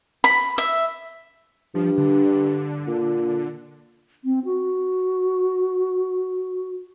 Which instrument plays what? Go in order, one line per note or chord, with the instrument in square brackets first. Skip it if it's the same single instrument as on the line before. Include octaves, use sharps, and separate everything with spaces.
[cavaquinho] B5
E5
[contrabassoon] G2 [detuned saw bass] F3
[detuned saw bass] D3
[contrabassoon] A#2
[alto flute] C4
F#4